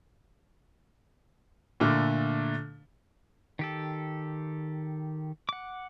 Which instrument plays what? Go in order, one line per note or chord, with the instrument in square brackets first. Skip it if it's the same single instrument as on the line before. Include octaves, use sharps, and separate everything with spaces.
[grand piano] A#2 D3 A3
[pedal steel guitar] D#3 G4 A4
F#5 D6